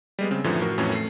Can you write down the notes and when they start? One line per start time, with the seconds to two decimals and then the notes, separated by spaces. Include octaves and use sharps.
0.19 G3 G#3 B3
0.31 C#3 C4
0.44 F#2 A2 D3 E3 F3
0.61 A2 F#4 A#4
0.78 F2 A2 E3 F#3 C#4
0.92 A3 C7